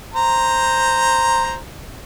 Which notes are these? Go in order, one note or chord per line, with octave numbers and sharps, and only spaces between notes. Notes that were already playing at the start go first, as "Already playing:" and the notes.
C5 A#5